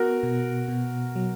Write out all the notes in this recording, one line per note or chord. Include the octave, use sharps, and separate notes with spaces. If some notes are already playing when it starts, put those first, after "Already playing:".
Already playing: B3 F#4 A#4
B2
B2
F#3